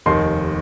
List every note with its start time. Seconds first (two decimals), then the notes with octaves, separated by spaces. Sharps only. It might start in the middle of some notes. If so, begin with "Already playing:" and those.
0.06 F1 D#2 D#3 C6